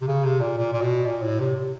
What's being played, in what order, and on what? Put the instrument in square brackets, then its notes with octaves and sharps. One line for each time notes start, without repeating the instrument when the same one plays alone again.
[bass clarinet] C3
C#3
C3
A#2
A#2
A#2
B2
A#2
A2
C3
C3